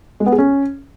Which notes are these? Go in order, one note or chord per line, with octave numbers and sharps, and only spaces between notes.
G#3
B3
G#4
C#4